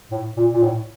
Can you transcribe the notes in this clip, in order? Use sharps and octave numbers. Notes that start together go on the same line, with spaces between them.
A2
A#2
A#2
A2